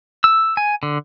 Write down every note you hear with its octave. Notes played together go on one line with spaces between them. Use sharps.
E6
G#5
D3